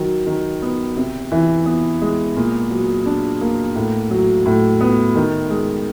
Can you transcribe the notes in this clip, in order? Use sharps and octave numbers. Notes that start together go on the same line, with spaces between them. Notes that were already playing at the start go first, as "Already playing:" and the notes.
Already playing: D#3 F#3
D#3
B3
C3
E3
B3
G#3
A#2
F#3
D4
A#3
A2
F#3
A2
B3
D#3
G#3